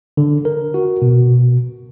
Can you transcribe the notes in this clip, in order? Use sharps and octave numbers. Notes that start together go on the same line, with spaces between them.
D3
A#4
F#4
B2